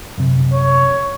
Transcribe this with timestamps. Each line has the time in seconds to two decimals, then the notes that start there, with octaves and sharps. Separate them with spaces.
0.18 F#2 C3
0.53 C#5